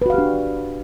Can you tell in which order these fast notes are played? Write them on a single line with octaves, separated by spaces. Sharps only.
B4 F#4 F5 G4 D4